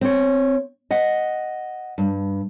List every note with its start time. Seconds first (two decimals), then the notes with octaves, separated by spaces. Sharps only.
0.01 C4 C#5
0.91 D#5 F#5
1.98 G2